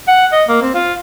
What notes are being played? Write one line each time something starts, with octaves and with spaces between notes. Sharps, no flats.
F#5
D#5
A#3
C4
F4